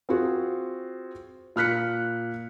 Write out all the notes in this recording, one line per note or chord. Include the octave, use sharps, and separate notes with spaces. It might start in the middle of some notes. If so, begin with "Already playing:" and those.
C4 F4 F#4 G#4
A#2 F6 F#6 B6 C#7